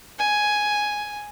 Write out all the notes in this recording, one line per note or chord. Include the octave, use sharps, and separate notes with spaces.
G#5